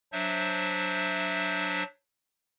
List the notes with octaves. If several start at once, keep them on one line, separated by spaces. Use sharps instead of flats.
F#3 D4 C5 E5